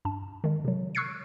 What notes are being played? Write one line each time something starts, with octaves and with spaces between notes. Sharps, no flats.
G2 A5
D#3 G#3
C3 F#3
C#6 E6 F#6 G#6 C7 C#7